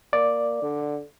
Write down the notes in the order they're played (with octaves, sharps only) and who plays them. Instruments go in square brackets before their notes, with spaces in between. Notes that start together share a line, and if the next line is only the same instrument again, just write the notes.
[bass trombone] A#3 [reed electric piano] D5
[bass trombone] D3